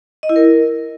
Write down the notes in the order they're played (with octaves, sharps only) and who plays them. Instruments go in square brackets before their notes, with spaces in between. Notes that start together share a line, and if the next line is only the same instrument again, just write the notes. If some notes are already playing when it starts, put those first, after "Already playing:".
[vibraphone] D#5
E4
A#4